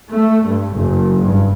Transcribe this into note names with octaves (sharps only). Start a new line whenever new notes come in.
A3
G2
F#1
G2